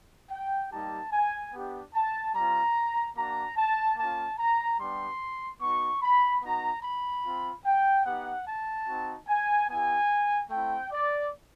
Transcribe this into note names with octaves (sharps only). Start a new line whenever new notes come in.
G5
G3 A#3 D#4 G4 A5
G#5
B3 D4 G4
A5
G3 C4 F4 A#5
A#3 D4 F#4 A#5
A5
A#3 C#4 F4 A5
A#5
G3 B3 D4 G4 C6
B3 D#4 F#4 C#6
B5
B3 D#4 F#4 A#5
B5
C4 F4
G5
B3 D#4 G4 F#5
A5
C4 D#4 F#4
G#5
B3 E4 G4 G#5
A3 C4 E4 G5
D5